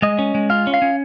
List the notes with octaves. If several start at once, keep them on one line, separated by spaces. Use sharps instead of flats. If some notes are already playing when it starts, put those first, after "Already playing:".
G#3 D#5
C#4
G#3
F4 F5
C#4
F5
C#4